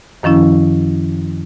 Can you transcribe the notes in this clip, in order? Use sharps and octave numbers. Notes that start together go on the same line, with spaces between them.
F#2 D#3 F3 C#4 E4